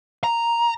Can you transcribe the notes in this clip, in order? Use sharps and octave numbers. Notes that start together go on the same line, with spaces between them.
A#5